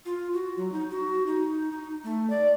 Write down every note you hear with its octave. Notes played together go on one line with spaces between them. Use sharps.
F4
F#4
F#3
D#4
F#4
D#4
D#4
A3
D5